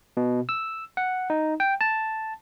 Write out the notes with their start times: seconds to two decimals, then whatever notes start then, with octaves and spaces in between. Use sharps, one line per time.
0.17 B2
0.49 E6
0.97 F#5
1.30 D#4
1.60 G5
1.81 A5